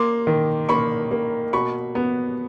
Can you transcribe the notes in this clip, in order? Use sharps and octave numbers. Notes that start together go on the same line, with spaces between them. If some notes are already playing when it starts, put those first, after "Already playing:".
Already playing: A#3 C6 D6
D#3
A#3 B5 C#6
A#3
B2 B5 C#6
B3